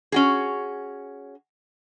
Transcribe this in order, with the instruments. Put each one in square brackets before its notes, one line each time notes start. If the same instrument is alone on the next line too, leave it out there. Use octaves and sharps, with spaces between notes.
[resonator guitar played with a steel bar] C#4 F#4 G#4